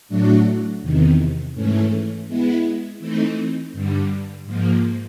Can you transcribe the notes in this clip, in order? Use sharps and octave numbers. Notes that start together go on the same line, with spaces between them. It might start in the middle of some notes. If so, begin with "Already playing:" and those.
A2 F#3 A3 D4 F#4
E2 C3 D#3
G#2 E3 A3 C#4
G#3 B3 E4
E3 A3 C4 D#4
G2 D3 G3
G#2 F3 A#3